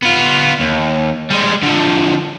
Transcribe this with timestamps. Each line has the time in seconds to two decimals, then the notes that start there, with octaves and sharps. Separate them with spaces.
0.03 B3 F4
0.60 D#2
1.30 G3 G#3
1.63 D3 F3